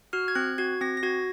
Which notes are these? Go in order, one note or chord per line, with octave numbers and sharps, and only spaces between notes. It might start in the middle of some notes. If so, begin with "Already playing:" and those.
F#4 F6
G#6
C4 F#6
F#4 G#6
C4 A#6
A#6
F#4 G#6